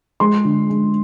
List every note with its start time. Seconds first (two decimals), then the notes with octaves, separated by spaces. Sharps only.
0.20 G#3 C6
0.45 D3
0.70 G#3